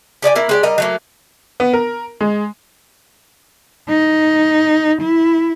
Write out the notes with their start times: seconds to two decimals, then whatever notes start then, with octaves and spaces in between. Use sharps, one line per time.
0.22 G4 D5 D#5 G#5
0.35 A#3 E4 A#4
0.49 G#3 G4 D5
0.63 G3 A#3 A#4 D#5
0.78 F#3 A3 A#3
1.60 B3
1.73 A#4
2.21 G#3
3.88 D#4
5.01 E4